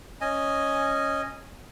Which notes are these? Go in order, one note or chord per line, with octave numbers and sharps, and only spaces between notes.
C#4 D#5 G#5